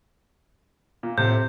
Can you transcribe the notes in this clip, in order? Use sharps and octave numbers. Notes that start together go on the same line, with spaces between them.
A#2
A2 C3 G6